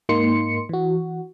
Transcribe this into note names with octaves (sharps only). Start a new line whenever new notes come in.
G#2 A#3 D#4 C6 C#7
E3 F#4